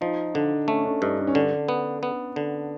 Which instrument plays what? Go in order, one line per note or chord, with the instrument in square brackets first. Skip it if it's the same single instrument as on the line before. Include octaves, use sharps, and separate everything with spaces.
[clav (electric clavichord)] F3 [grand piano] D#4
[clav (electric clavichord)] D3 [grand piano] D4
[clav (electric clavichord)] A3 [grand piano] C#4
[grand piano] D4
[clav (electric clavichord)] G2 [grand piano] D#4
[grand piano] D4
C#4
[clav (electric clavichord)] D3 [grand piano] D4
[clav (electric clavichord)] B3
B3
D3